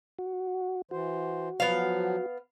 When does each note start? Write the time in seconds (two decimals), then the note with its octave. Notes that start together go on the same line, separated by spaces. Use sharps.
0.19 F#4
0.91 E3 F#4 C5
1.60 F3 F#3 B3 F5